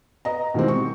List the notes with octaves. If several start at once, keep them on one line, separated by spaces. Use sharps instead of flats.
B4 D#5 A#5
B2 D#3 E3 G3 G#3 C4
C#6